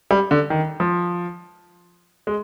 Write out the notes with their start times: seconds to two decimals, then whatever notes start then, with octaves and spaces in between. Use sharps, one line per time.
0.11 G3
0.31 D3
0.50 D#3
0.80 F3
2.27 G#3